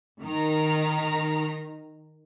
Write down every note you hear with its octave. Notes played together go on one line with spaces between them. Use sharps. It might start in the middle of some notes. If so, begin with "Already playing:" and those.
D#3 A#5